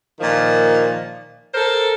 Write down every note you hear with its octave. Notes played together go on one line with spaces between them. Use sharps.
A#2 D#3 F3
A4 A#4 C5